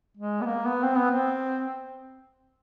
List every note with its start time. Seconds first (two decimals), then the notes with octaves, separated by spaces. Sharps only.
0.17 G#3
0.41 B3
0.45 A#3
0.65 B3
0.84 C4
0.97 B3
1.10 C4